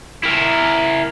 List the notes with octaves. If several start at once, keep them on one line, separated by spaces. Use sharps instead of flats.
E4 A#4